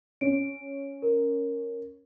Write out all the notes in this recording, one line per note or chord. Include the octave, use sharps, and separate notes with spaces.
C#4 D7
A#4